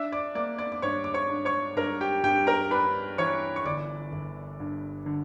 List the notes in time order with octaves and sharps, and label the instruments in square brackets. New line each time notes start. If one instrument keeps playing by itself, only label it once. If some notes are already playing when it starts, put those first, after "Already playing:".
Already playing: [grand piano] D4 E5 E6
D5 D6
A#3 D5 D6
D5 D6
D6
G2 C#5 C#6
D6
C#5 C#6
D4
C#5 C#6
G2 A#4 A#5
G4 G5
G2 G4 G5
A#4 A#5
D4 B4 B5
E3 C#5 C#6
C#6
G1 D5 D6
G1
G2
D3